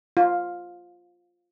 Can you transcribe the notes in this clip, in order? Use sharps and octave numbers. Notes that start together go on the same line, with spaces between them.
F4